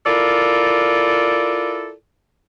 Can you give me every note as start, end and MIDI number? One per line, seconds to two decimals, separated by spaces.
0.06 1.93 64
0.06 1.93 65
0.06 1.93 69
0.06 1.93 70
0.06 1.93 74